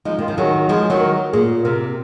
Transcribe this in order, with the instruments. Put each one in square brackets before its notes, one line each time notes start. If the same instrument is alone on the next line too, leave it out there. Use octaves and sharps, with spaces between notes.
[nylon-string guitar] F3 G#3 [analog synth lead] D#4
[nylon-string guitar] D#3 [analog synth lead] F4
[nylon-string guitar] F3
[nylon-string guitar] D#3 F#3 [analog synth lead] G#4
[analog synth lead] A#4
[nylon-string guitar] F3 G#3 [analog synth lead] G#4
[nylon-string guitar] D#3 F#3
[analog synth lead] A#4
[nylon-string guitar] A#2 [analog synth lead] G#4
[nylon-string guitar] C3 [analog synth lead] A#4